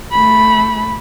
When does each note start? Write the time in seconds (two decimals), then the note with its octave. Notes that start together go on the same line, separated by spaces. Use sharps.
0.12 A3 B5